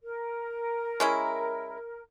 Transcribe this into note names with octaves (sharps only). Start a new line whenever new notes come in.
A#4
G#3 C#4 E4